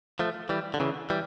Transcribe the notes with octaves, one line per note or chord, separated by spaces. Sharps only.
F3 A3
E3 G3
D3
C#3 E3
E3 G3